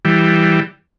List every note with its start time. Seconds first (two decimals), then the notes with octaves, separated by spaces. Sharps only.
0.05 E3 G3